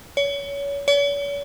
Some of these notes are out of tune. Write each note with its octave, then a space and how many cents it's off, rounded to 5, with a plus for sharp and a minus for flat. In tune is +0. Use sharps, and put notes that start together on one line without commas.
C#5 +30
C#5 +45